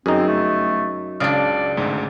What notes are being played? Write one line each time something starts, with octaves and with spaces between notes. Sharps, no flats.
G1 F#2 C4 D#4 G#4
A3
C#2 C#3 D4 D5 D#6 F6
G#1 D2 G#2